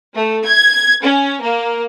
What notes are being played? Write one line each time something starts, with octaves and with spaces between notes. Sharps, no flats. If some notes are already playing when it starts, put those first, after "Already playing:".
A3
G#6
C#4
A#3